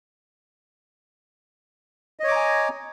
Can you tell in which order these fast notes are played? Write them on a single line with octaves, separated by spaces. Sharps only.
D#5 C#5 D6 A#5 G#5